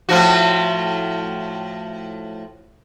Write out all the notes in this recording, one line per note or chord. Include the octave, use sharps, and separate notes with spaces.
A2 F3 F#4